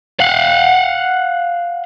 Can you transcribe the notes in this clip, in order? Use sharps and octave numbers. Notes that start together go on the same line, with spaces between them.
F5 F#5